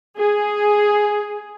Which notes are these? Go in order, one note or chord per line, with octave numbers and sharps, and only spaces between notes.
G#4